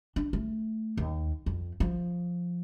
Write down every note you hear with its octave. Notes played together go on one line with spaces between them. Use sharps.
D4
A3
D#2
F2
F3